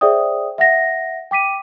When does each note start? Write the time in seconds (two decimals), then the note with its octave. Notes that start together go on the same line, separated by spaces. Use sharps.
0.01 G#4 C5 D5 E5 G5 D#6
0.58 E5 F#5 A#6
1.31 G5 D6 B6 D#7